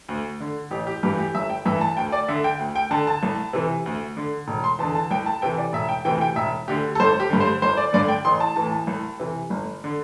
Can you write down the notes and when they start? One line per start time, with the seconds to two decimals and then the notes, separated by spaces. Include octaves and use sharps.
0.09 D2
0.40 D3
0.71 A1 G4
0.87 G4
1.03 G2 E3 G4
1.18 G4
1.34 G1 E5
1.50 G5
1.66 G2 E3 E5
1.81 A5
1.97 D2 G5
2.12 D5
2.28 D3 E5
2.44 G5
2.59 D2
2.75 G5
2.91 D3 A5
3.07 A5
3.23 C2
3.53 C3 E3
3.86 D2
4.17 D3
4.48 E1
4.64 C6
4.79 E2 A5
4.83 D3
4.95 A5
5.11 C2 G5
5.26 A5
5.42 C3 E3 G5
5.58 D5
5.73 E1 E5
5.89 G5
6.05 D2 C3 E3 G5
6.21 G5
6.36 E1 E5
6.68 D2 D3 G4
6.95 A4
7.00 G1 C5
7.20 G4
7.30 G2 D3
7.40 C5
7.62 G1 C5
7.77 D5
7.93 G2 D3 D5
8.08 G5
8.25 A1 C6
8.40 A5
8.56 A2 E3 A5
8.72 A5
8.87 C2
9.20 C3 E3
9.50 G1
9.84 D3